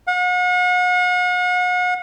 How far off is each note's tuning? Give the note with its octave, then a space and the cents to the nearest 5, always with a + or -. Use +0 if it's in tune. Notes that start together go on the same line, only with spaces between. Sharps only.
F#5 -40